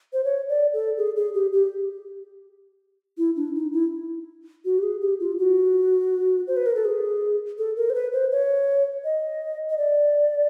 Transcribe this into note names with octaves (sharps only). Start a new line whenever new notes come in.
C5
C#5
D5
A4
G#4
G#4
G4
G4
E4
D4
D#4
E4
F#4
G4
G#4
G4
F4
F#4
C5
B4
A#4
A4
G#4
A4
A#4
C5
B4
C5
C#5
D#5
D#5
D5